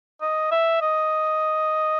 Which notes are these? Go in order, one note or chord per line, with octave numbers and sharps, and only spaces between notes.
D#5
E5
D#5